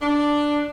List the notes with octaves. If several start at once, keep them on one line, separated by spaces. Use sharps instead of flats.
D4